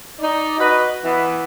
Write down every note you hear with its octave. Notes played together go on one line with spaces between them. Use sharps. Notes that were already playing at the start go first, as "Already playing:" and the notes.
D#4 D5
F#4 B4 D#5
E3 B3